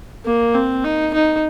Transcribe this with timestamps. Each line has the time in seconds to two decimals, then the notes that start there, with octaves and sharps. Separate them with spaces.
0.26 A#3
0.54 C4
0.85 D#4
1.14 D#4